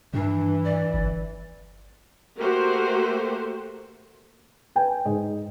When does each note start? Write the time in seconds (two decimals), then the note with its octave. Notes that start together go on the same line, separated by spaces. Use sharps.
0.14 G2 E3 D4
0.64 D5
0.94 G1
2.39 A3 A#3 F#4 G4 A#4 C5
4.76 B4 G5 G#5
5.05 G#2 D#5